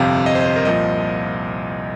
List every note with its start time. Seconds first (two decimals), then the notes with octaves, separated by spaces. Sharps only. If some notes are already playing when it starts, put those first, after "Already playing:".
Already playing: G1 F2 C3 F5
0.26 D#5
0.35 C5
0.41 D#5
0.46 C5
0.56 A#4
0.65 C2 A#2 F3 D#5